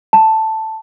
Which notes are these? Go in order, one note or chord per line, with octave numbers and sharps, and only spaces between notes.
A5